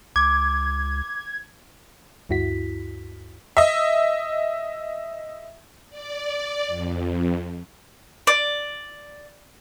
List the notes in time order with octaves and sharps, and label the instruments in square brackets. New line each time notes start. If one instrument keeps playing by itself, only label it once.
[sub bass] C#2 [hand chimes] D6 [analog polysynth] G#6
[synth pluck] D2 G2 E4 F#4 B6
[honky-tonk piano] D#5 E5
[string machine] D5
F2
[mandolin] D5